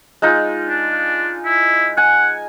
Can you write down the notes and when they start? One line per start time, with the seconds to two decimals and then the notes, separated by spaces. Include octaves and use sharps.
0.22 G#3 D#4 F4
0.69 D4
1.46 E4
1.97 F#5 G#5